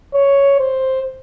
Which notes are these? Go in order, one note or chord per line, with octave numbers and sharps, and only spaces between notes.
C#5
C5